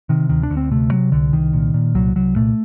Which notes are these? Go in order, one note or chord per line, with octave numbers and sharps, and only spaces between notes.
C3 D#3
D2 D#3
D4
D2
C4
C3 A3
C3 F#3
C2 D3
C2 D#3
A#2
A#2
C2 F#3
C2 F#3
A#2 A3